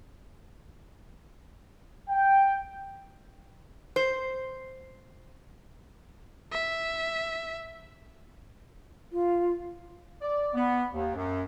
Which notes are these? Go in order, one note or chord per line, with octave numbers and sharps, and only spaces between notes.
G5
C5
E5
F4
D5
B3
D#2
F#2